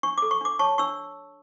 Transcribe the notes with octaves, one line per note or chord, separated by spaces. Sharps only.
D4 C#6
A4 D6
C#6
D4 D6
C#5 A5 C#6
D4 C#6 E6